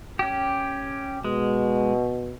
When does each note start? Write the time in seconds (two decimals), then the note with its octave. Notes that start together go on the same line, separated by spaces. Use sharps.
0.19 C#4 G4
1.24 B2 G#3